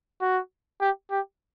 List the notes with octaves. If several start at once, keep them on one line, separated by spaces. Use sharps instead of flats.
F#4
G4
G4